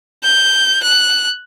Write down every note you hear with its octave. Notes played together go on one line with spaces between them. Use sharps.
G6
F#6